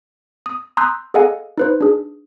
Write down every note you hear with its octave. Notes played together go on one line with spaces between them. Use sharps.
D#6
A#5 C6 D#6 E6 F#6 G6
G#4 A4 D#5 F5 F#5 G#5
D#4 B4 C5
D4 G#4